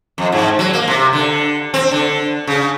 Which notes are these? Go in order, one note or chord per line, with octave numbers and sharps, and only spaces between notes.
F2
G#2
F#3
A#3
C3
D3
C4
D3
C#3